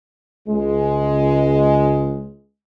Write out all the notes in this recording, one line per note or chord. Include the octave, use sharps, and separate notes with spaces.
C#2 G#3